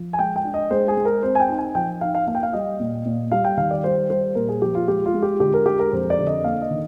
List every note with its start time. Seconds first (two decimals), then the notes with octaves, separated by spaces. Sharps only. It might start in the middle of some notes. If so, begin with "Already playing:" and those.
Already playing: F3
0.13 G#5
0.19 G#3 G5
0.36 G5
0.45 D4
0.54 D#5
0.71 G#3 C5
0.88 G#4
0.97 G#3
1.05 A#4
1.23 C4 C5
1.35 G#5
1.40 G5
1.49 D#4
1.58 G#5
1.75 F3 G5
2.01 D#4 F5
2.15 F5
2.27 A#3 F5
2.35 G5
2.43 F5
2.53 G3 D#5
2.80 A#2
3.05 A#2
3.31 G3 F5
3.44 G5
3.57 D#3 F5
3.71 D5
3.84 G3 C5
4.10 G3 C5
4.35 A#2 A#4
4.49 G#4
4.62 F3 G4
4.75 F4
4.88 G#3 G4
5.06 F4
5.14 G#3
5.23 G4
5.40 D3 G4
5.54 A#4
5.66 G#3 G4
5.79 A#4
5.92 F2 C5
6.10 D5
6.19 D3
6.27 D#5
6.44 A#3 F5
6.62 D#5
6.71 D#3